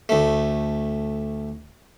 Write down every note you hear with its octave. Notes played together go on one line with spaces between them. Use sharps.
D2 A3